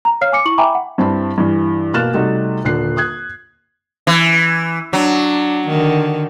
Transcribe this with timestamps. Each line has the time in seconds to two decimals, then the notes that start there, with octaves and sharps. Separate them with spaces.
0.05 A#5
0.21 C#5 F5 F6 C7
0.32 G#5 D6 C#7
0.45 E4 C#6 F#7
0.58 E5 G5 G#5 A#5 B5 D6
0.74 F#5
0.98 G2 C4 E4 A5 B5
1.38 G2 E3
1.94 B2 A#3 F6 F#6 A6 E7
2.14 C3 G3 A3 D#4 F#4
2.64 D#1 D3 F#6 C7
2.97 D#6 F#6 G#6
4.07 E3
4.93 F#3 D4
5.68 D3 D#3